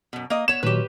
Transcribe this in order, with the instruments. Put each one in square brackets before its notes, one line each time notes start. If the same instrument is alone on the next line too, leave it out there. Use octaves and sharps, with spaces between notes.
[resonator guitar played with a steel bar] F#2 B2
A#3 D#5
[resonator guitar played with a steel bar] B3 C#5 [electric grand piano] E7
[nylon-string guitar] A#2 D#3 F#3 [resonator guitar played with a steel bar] G4 B4